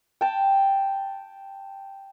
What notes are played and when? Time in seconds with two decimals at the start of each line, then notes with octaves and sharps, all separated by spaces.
0.21 G5 A5